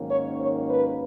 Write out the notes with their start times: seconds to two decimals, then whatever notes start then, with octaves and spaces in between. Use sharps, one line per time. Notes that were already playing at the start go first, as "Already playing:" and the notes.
Already playing: G#2 D#3 F#3 A#3 C#4
0.11 C#5
0.41 C#5
0.70 B4